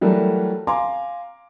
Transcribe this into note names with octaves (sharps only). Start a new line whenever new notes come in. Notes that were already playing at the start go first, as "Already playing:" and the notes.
E3 F#3 G3 A3 A4 A#4
F5 G#5 A#5 C6 D6